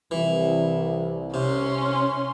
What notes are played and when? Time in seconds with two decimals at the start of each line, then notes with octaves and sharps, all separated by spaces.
0.11 C2 E3
1.34 C3 C#4 C6